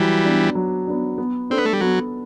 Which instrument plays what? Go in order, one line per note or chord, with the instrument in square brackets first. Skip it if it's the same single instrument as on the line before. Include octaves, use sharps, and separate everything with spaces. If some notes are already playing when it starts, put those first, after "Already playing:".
Already playing: [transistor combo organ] E3 G3 [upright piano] F#3
[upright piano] B3 D4
F#3
B3 D4
B3
[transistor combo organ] C4 [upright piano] D4 A4
[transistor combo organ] B3
A3
G3
[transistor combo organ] F#3 [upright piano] B3